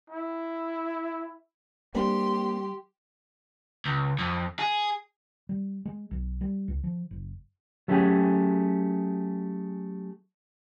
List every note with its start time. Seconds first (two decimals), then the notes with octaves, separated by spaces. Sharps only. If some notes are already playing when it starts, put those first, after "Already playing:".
0.10 E4
1.95 G3 A#3 C4 D4 G4 C6
3.85 C#2
4.19 F2
4.59 G#4
5.49 G3
5.85 G#3
6.11 B1
6.41 G3
6.68 C#2
6.84 F3
7.11 F#1
7.88 F#3 A3 C#4 G4 G#4